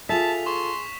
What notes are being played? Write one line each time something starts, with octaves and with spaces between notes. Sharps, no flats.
F4 G#4 A4 E5 G#5 A5 B6 F7
G#4 C6 C#6 E7